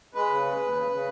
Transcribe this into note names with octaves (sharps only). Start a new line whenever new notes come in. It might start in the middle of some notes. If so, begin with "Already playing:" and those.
G#3 B4
C#3
G#3
D#2
C#3
C#3